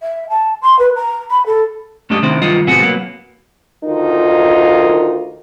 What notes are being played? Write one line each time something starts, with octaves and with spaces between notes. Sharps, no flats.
E5
A5
C6
B4
A#5
B5
A4
F#2 A3 D4 G4 D#5
C3 D#3 C4 D4 E4 C5
G2 D#3 F#3 B3 F4 D#5
A2 C3 B3 C4 F#4 G#4
F#3 A#3 B3
D2 D#3 D#4 F4 A#4